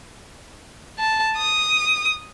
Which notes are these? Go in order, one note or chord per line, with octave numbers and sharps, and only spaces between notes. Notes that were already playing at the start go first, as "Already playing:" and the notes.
A5
D#6